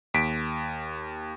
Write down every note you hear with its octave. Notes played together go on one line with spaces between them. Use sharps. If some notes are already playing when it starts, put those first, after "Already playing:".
D#2 B6 D7